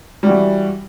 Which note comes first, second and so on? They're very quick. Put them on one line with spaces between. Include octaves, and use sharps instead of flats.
G3 F#4 E3